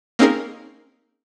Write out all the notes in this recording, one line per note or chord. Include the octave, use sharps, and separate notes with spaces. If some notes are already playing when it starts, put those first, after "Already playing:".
A#3 C4 C#4 D#4 G#4 A#4